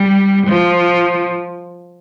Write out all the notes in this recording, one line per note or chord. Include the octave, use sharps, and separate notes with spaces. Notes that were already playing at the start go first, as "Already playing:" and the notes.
Already playing: G3
F3